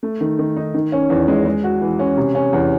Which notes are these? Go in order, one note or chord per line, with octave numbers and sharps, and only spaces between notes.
A3
D#3
D#3
D#4
D#3
C#4
E2
G#3
G#3
F#4
E3
C#4
C3
C#4
E2